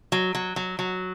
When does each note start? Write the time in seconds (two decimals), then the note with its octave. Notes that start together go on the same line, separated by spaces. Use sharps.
0.12 F#3
0.35 F#3
0.56 F#3
0.79 F#3